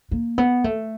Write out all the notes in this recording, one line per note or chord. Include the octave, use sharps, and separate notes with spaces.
A#3
B3
A3